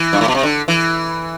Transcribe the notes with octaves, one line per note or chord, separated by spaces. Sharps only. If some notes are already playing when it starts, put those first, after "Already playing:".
Already playing: E3
G2
A2
B2
C3
D3
E3